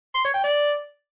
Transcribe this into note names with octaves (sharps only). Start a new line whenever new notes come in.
C6
C#5
G5
D5